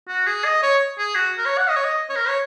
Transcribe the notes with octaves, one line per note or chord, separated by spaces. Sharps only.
F#4
G#4
D#5
C#5
G#4
F#4
A#4
C#5
F#5
D#5
C#5
D#5
C#5
A#4
C#5